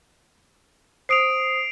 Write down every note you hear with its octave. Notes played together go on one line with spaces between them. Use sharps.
C5 D#6 C7 D7 F7